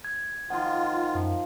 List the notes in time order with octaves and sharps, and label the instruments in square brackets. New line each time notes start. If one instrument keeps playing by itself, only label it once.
[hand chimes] G#6
[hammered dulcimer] D#3 F3 [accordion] F4 [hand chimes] F#5
[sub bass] F#2 [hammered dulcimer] F3